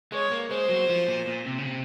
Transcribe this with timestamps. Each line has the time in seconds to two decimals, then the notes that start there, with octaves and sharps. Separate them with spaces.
0.12 G#3 C#5
0.32 A#3
0.51 G#3 C5
0.69 F#3
0.90 F3
1.08 A#2
1.27 A#2
1.46 C3
1.58 C#3
1.65 C3